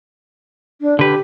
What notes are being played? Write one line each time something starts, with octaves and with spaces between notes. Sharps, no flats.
D4
D3 G4 B4